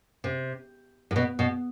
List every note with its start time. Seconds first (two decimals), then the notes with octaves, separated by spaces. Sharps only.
0.24 C3
1.11 A2
1.16 B2
1.39 B2